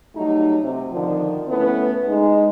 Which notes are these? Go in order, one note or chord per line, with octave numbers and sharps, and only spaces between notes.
F#3 G3 A3 D#4
C3
D3 D#3 F3
A3 B3 C#4 E4 A4
G#3 D#4